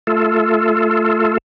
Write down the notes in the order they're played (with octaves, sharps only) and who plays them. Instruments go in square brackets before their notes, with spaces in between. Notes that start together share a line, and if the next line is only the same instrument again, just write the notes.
[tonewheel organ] A3 F4 A4